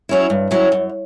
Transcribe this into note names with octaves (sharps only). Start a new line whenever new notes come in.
F#3 C#4 E4
G2
F#3 C#4 E4
F#2